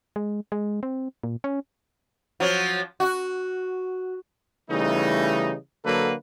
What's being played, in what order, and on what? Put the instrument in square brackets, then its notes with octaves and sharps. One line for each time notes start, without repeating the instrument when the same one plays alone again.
[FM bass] G#3
G#3
C4
A#2
C#4
[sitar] F3 F#3
F#4
[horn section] C#3 E3 G3 A3 D#4
D3 F#3 A#3 A4 B4